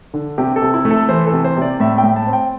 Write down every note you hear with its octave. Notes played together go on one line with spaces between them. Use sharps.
D3
C3 G4
A4
C3
E4
A3
A4
E3 C5
A4
C3
C5
C3 D5
A2 E5
G5
A2
A5
C4
G5